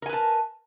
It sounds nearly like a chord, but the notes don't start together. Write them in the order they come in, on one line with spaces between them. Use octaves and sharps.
A#4 G#5 B4 A5